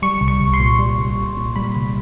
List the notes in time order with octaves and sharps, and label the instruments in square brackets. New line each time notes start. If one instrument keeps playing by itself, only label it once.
[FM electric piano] G3 C#6
C2
C#6
C2
C6
A#2
G3
C2
C2
A#2
G3 B5
C2